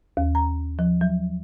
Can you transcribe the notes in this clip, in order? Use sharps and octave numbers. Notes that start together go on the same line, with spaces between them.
D#2
A#5
F3
F#3